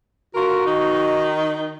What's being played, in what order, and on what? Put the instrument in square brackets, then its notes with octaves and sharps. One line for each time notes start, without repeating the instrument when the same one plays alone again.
[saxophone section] D3 F4 A#4 [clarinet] F#4
[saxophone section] D#3 D#4